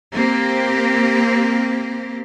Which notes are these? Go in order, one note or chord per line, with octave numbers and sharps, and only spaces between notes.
A#3 C4 G4